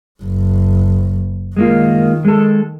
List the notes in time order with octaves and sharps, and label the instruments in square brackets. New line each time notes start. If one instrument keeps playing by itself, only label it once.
[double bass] F#1
[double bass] D#3 [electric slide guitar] G#3 A#3 F4
[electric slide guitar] G#3 A4